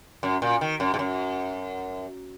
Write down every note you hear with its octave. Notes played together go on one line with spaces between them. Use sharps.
F#2
A#2
D#3
F#2
G#2
F#2